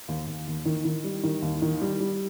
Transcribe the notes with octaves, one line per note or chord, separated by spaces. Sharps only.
D#2
D#2
D#2
D#3
D#3
G3
D#3
D#2
D#3
G3
G3